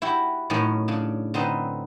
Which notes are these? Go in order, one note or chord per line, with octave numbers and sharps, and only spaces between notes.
E4 F#4 G4
F#2 A2 D#3 C#4 D#4
C#3 D4
D3 C4 D#4 B4 D#5